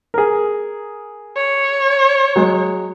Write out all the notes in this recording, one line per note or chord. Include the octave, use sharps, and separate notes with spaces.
G#4 A#4
C#5
F#3 G#3